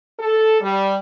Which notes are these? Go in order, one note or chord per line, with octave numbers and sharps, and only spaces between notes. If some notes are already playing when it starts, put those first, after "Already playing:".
A4
G3